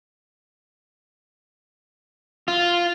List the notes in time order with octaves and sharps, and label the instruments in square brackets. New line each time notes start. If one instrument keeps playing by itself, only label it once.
[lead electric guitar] F4